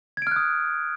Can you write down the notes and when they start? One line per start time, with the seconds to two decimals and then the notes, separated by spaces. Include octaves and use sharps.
0.17 G#6
0.22 D7
0.27 F6
0.31 F#6
0.36 D#6